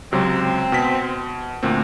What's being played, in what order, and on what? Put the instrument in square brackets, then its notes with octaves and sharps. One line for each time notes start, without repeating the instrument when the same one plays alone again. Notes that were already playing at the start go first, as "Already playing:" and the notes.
[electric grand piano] C#2 C3 F#3 [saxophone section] C4
[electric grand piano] B2 B6
D2 A#2 C4